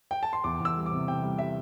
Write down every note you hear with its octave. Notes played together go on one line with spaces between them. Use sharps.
G5
A5
C6
E2 D6
E2 E6
G3
D6
C3
C3 G5
G3
G3 E5